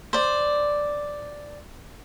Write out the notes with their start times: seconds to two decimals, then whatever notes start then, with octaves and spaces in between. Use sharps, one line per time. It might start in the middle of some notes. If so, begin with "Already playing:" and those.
0.13 C5 D5